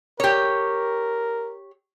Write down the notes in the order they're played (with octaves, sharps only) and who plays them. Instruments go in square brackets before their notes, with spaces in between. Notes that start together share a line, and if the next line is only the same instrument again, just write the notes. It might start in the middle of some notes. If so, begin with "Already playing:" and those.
[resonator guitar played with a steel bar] G4 C#5 [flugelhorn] A#4